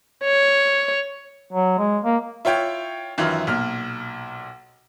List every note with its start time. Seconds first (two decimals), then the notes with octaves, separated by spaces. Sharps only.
0.24 C#5
1.53 F#3
1.78 G#3
2.04 A#3
2.45 E4 F4 C#5 G5
3.18 F#2 D#3 E3 F4
3.47 B1 A#2 F6